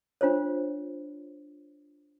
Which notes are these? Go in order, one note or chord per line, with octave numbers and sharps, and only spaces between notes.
D4 F4 C5 C#5